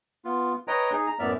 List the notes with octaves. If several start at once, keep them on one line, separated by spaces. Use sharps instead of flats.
B3 F4
B4 C#5 D#5 G5 A#5 D#6
D#4 G#4
A#5
F#2 A2 B3 D5 E5 F6